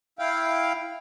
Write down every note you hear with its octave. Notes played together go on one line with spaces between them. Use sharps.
E4 F5 G5